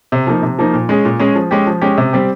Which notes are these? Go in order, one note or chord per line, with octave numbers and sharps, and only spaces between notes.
C3
F3 A#3 D#4
C3
F3 A#3 D#4
A#2
G#3 C#4 G#4
A#2
G#3 C#4 G#4
F3
G#3 C#4 G4
F3
G#3 C#4 G4
C3
G3 C4 G4